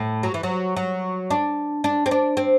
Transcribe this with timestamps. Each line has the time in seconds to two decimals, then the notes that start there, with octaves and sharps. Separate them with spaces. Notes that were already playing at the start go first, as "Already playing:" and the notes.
Already playing: A2
0.23 F#3
0.34 E3
0.43 F#3
0.76 F#3
1.30 D4
1.84 D4
2.06 C4
2.11 D4
2.37 C4